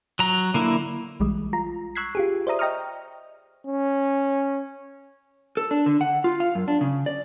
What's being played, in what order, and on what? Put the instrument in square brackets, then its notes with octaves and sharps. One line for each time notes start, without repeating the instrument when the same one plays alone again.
[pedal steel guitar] F#3 A#5
D3 A#3 E4
[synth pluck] B1 E3 G3 G#3
F4 A#5
C#6 E6 F#6 G#6 B6 C7
F4 G4 G#4
C5 D5 E5 A#5 D#6
D#5 G5 A#5 C#6 D#6 F6
[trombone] C#4
[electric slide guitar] A4
D4
D3
F#5
F4
F5
F#2
D4
C#3
D5